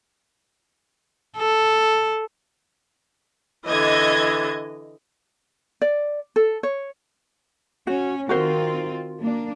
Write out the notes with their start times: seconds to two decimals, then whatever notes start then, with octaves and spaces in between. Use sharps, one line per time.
1.37 A4
3.67 D3 E3 D#5 G#6
5.82 D5
6.36 A4
6.63 C#5
7.87 C#4 F#4
8.29 D#3 C4 F4 F#4 A#4 C5
9.20 A#3 D4